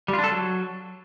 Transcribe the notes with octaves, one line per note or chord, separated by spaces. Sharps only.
G3
F4
D4
A4
F#3